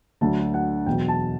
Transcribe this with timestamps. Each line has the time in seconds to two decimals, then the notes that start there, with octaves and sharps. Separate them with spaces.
0.21 D2 D3 F#3 A5
0.54 F#5
0.86 E2 B2 F#3 G5
1.08 A5